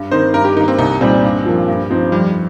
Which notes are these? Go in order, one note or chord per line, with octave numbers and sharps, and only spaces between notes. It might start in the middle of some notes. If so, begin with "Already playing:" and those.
Already playing: G2
D#3 C4 D#4 C5
G2 A#4
G4
D#3 A#3 D#4
C4
C2 D#4
A#2 G3 C4 D#4
G2
F3 A#3
G2
F3 C4 D#4
F2 G3